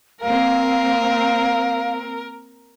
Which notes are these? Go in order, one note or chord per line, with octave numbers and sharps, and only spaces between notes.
A#3 C4 A#4 F5